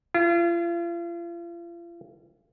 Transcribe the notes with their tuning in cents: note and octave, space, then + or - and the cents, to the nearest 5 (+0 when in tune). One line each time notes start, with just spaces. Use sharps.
F4 -40